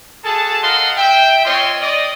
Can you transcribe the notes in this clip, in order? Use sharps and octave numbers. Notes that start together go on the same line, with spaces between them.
F#4 G#4 A4 A5
A#4 D#5 F5 F#5 C6
E5 G5
C4 F4 C#5 D#5 C6
D5 D#5